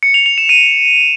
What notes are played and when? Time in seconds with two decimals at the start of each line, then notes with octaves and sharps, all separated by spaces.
0.03 C#7
0.14 F7
0.26 F7
0.38 E7
0.49 D#7